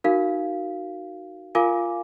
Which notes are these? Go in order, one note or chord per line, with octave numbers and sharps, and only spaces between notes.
D#4 F#4 A#4 F5
F4 A#4 F5 G#5 D6